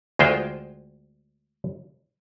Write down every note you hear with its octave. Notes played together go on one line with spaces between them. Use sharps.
D2 G#3 F4 C5 G5